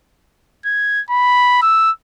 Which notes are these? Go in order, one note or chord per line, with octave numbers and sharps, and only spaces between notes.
G#6
B5
E6